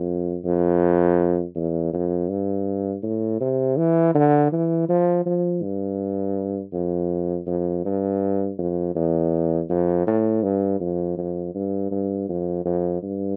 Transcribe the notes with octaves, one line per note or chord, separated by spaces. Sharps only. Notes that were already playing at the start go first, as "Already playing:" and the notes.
Already playing: F2
F2
E2
F2
G2
A2
C3
E3
D3
E3
F3
F3
G2
F2
F2
G2
F2
E2
F2
A2
G2
F2
F2
G2
G2
F2
F2
G2